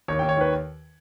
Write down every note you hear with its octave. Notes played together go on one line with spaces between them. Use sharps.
D#2 C#5
D#2 G5
C#5
D#3 B4